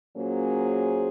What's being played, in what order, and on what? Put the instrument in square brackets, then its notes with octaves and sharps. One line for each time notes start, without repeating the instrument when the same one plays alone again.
[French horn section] A#2 F#3 A#3 C#4 G#4 C5